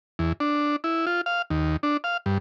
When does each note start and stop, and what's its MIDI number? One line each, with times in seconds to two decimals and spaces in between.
0.19 0.33 40
0.40 0.76 62
0.84 1.06 64
1.07 1.21 65
1.26 1.42 77
1.50 1.77 39
1.83 1.97 62
2.04 2.17 77
2.26 2.38 43